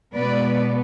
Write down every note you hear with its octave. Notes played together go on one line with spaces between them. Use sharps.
B2 G#3 B3 B4 D5